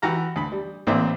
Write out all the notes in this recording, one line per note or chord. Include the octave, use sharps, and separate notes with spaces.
E3 F#4 G4 A#5 F6
D2 B5
G3
A1 A#2 A#3 C4 D5 E5